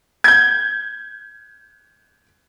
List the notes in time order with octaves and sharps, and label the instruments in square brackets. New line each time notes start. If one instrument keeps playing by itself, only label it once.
[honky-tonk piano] G6 G#6